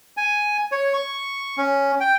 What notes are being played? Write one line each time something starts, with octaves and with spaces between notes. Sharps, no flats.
G#5
C#5
C#6
C#4
G5